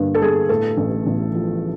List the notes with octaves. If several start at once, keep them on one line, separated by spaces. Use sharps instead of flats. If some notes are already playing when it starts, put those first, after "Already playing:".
Already playing: G2 D3 A#3
A4
G3 G#4
A2 A4
A1
A1
F3